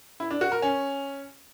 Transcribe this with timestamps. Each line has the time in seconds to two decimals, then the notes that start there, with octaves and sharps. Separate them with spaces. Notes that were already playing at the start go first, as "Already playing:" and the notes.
0.20 E4
0.31 D4
0.41 F#4
0.52 A#4
0.62 C#4